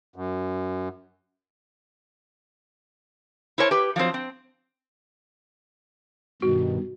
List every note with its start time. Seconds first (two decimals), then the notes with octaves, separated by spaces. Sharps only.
0.16 F#2
3.58 E4 A#4 C5 C#5 A5
3.71 G4 B4
3.96 F3 F#3 A3 C4 C5
4.14 C4
6.42 G2 B2 D#3 F#4